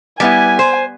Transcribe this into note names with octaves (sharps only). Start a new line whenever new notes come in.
G3 B3 E4 G#5
C5